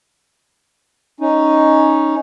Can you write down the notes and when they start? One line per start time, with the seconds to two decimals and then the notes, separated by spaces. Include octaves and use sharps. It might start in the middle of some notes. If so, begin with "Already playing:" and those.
1.20 C#4 D#4